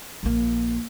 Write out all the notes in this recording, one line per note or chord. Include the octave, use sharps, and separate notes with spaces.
A#1 A#3